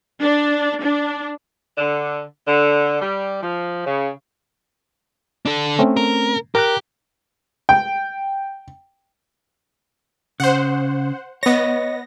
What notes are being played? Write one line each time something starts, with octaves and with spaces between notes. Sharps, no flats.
D4
D4
D3
D3
G3
F3
C#3
D4 A4
A3 C4 C#4
A#4
G4 A#4 A#5 F#6
G5
C#3 C5 F#5
B3 C#5 D#5 A#6